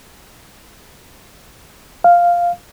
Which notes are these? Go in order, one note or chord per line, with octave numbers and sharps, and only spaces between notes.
F5